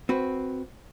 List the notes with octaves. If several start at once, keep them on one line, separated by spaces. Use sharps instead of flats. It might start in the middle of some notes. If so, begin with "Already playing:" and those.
C4 F#4 B4